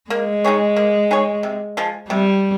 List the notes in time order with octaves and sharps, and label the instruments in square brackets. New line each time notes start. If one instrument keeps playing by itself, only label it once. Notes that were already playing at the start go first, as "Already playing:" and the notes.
[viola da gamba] G#3 [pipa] A#3
[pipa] D#4 G#4 C#5
A#3
D#4 G#4 C#5
C3
F3 G#3
[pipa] C3 [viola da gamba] G3